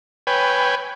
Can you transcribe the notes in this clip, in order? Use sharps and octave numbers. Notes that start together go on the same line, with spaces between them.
B4 C#5 G5 G#5